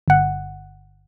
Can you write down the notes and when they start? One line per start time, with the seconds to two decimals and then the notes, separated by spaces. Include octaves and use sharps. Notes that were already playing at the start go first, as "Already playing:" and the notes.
0.08 G1 F#5